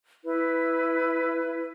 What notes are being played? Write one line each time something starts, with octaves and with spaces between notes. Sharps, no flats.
E4 B4